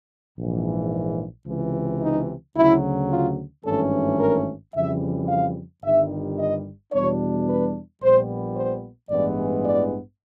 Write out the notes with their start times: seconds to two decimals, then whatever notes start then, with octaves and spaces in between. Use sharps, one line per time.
0.37 A#1 G#2 E3
1.46 C#2 C3 E3
2.01 D#4
2.56 D2 C#3 F#3 E4
3.10 F4
3.65 G#1 G2 E3 A3 C#4 A4
4.19 A#4
4.74 F2 C#3 E3 G3 E5
5.29 F5
5.83 G1 G2 D#3 G3 E5
6.38 D#5
6.92 E2 B2 G3 B3 D4 C#5
7.48 B4
8.01 A#1 A#2 G3 B3 C5
8.57 C5
9.10 A1 G2 E3 G#3 B3 D5
9.65 D5